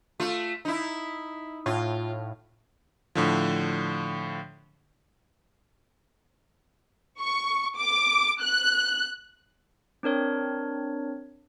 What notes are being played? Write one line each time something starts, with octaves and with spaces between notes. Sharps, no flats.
A3 F4
D#4 E4
A2 F4
A2 D3 F3
C#6
D6
F#6
C4 D4 A#4 C#5